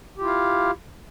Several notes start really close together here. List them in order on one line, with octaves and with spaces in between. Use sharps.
G4 F4 E4 F5